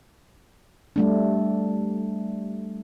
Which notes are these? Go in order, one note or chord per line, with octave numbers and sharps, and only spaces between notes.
G3 A3 D4